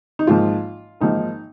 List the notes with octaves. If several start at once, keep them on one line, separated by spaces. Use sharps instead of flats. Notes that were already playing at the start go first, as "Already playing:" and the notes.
D#4
G#1 G#2 F3 A#3 F4
G#1 G#2 F3 A#3 D#4